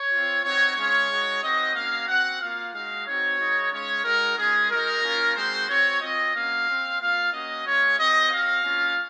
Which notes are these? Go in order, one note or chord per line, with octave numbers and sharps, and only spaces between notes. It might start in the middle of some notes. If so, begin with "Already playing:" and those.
Already playing: C#5
C4 F4
C4 D#4 F#4 C#5
G#3 C#4 F4 C#5
G#3 D#4 F#4
C4 D#4 F#4 D#5
A#3 C#4 F#4 F5
C4 F#4 F#5
A#3 F4 F5
G#3 D#4 F#4 F5
C4 D#4 F#4 C#5
G#3 D#4 F#4
G#3 C#4 F4 C#5
G#3 D#4 F#4 A#4
G#3 C#4 F4 G#4
G#3 D#4 F#4 A#4
A#3 C#4 F4
G#3 C4 D#4 F#4 C5
C4 F#4 C#5
C4 F4 D#5
A#3 C#4 F#4 F5
C4 F4
A#3 F4 F5
A#3 C#4 F#4 D#5
G#3 C#4 F4 C#5
C4 F#4 D#5
C4 F#4 F5
A#3 C#4 F4